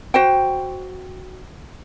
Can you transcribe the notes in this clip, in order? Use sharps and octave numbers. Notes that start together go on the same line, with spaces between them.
F#4 C5 G5